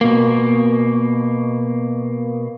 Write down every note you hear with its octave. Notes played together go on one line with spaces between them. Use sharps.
B2 A#3